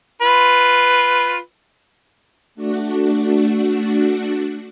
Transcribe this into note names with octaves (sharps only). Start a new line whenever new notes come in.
F4 B4
A3 D4 F#4